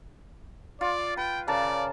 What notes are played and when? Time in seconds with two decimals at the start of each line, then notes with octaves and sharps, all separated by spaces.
0.81 F4 D5
1.17 B4 G5
1.48 C#3 A#4 D5 A5